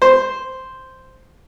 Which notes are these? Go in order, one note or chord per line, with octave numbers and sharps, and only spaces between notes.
C5